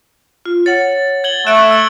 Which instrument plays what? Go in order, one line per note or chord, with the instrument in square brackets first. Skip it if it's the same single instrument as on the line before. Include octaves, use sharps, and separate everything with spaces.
[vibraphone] F4
[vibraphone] C#5 F#5 [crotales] A6
[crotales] G#6 F#7 G7
[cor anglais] A3 [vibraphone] E5 [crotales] F#6 D7
[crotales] E6 D7 F#7